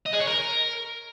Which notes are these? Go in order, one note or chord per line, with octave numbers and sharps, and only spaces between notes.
D#5
G#4
C#5
A#4